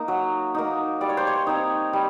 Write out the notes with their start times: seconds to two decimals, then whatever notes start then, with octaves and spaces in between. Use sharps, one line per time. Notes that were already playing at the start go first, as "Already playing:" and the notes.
Already playing: A#3 D#4
0.08 F#3
0.54 A#3 D#4
1.01 G3 D5
1.09 C#5
1.17 C5
1.27 C#5
1.47 C4 D#4
1.93 G3